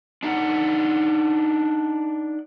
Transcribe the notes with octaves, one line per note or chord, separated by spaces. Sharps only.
D4 D#4 F5 F#5